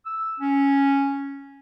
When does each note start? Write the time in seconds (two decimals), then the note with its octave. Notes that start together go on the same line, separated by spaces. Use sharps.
0.06 E6
0.40 C#4